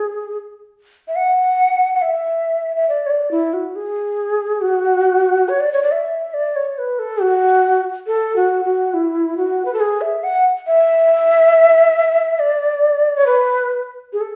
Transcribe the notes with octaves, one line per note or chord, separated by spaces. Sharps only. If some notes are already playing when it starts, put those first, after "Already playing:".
Already playing: G#4
E5
F#5
F#5
E5
E5
D5
C#5
D5
E4
F#4
G#4
F#4
C#5
D5
C#5
D5
E5
D5
C#5
B4
A4
F#4
A4
F#4
F#4
E4
F#4
B4
A4
G#4
E5
F#5
E5
D5
C#5
B4
G#4
A4